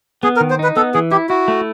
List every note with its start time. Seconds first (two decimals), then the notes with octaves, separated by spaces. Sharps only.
0.23 B3 G#4
0.36 A#4
0.41 D#3
0.50 C5
0.59 D#4 B4
0.77 B3 A4
0.94 E3 G#4
1.12 E4 G4
1.29 E4 F#4
1.48 A3